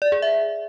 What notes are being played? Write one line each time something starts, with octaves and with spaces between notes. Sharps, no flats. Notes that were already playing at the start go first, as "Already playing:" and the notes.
D5
G#4
E5